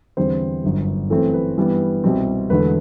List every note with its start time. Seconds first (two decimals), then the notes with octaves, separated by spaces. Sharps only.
0.17 E2 D3 G3 C4 C5
0.64 G1 F#2 D3
1.10 F#2 E3 A3 C4 A4
1.34 B4
1.57 G2 E3 G3 B3
2.04 C2 B2 G3 C4
2.50 E1 E2 D3 A3 B4